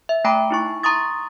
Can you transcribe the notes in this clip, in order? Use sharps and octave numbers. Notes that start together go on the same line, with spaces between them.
E5
A3 G5 A#5 B5 D6 D7
D#4 E4 C#6
A#5 C6 C#6 D#6 A6